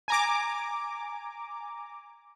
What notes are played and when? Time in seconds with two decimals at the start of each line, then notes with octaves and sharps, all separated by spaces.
0.08 G#5 A#5 D6